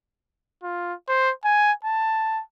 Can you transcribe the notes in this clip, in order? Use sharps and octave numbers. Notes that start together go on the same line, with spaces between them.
F4
C5
G#5
A5